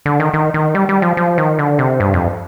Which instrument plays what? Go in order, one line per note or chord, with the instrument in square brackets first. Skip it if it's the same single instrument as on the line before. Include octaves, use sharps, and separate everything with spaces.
[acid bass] D3
D#3
D#3
D#3
G3
G3
F3
F3
D#3
D3
C3
G2
F2